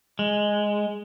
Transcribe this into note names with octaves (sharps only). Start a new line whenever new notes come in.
G#3